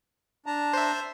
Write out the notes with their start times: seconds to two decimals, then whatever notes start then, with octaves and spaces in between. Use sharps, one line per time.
0.46 D4 A5 A#5
0.74 C5 E5